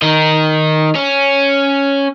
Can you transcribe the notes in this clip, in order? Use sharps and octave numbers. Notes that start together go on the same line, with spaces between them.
D#3 D#4
C#4